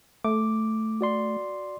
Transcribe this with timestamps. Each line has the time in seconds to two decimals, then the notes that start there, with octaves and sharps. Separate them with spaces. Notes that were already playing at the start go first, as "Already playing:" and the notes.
0.24 A3 D6
1.01 F#4 D5 C6